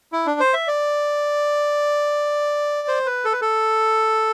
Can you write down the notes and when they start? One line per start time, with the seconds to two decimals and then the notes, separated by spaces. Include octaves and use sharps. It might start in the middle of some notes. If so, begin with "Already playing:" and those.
0.12 E4
0.26 D4
0.40 C5
0.54 E5
0.68 D5
2.88 C5
3.06 B4
3.25 A4
3.33 B4
3.41 A4